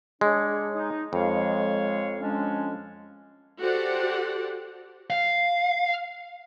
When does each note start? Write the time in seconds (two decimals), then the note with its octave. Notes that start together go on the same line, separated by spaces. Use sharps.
0.21 G#3 D4 C#5
0.74 D#4
1.13 F2 G#3 C#5 F5
2.20 G#3 C#4 D4
3.59 F#4 G4 A4 C5 D5 F#5
5.10 F5